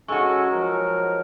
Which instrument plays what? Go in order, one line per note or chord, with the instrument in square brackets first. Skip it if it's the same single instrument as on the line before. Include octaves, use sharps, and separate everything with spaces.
[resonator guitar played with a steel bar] G#3 F#4 [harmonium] C#4 D#4 [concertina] A4 G#5 [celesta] C#6
[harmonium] F3 F#3 D#4 [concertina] A#4